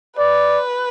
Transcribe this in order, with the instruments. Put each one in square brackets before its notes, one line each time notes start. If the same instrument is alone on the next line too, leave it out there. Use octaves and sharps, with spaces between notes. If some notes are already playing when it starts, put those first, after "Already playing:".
[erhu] B4 [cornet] D5